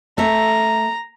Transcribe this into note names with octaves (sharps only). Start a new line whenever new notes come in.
A3 E5 A#5